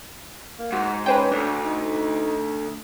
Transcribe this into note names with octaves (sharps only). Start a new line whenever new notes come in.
A#3
G#2 F#4
C#4 B4 C5 G5
D2 D4
D#4